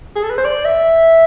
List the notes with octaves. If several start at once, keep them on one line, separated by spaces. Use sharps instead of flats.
G#4
A4
B4
C5
D5
E5